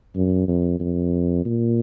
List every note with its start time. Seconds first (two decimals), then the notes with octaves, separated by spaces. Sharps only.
0.16 F#2
0.48 F2
0.80 F2
1.45 A#2